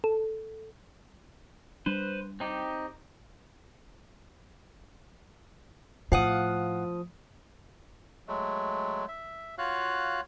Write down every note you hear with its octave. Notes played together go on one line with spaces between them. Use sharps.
A4
G3 D4 B4 C5
C4 D#4 G4
A2 F3 F5 F#5 D#6
F#3 G#3 A3
E5
F4 F#4 C#5 F5 F#6